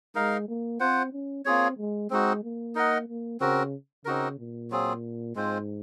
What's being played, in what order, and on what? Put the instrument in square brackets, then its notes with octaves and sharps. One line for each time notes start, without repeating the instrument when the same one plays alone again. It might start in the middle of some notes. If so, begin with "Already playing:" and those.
[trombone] G#3 [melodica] D#4 A#4 F5
[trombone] A#3
[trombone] C4 [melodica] F4 C5 F#5
[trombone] C#4
[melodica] A#3 F4 G#4 C#5 [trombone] C4
[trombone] G#3
[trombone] G#3 [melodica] C4 D#4 F#4
[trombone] A#3
[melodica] D#4 A#4 D#5 F#5
[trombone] A#3
[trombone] C#3 [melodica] C4 F#4 A#4
[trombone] C#3 [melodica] C4 D#4 F#4 A#4
[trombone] A#2
[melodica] F#3 C4 F4 G#4
[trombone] G#2 [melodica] G#3 C4 F4 C5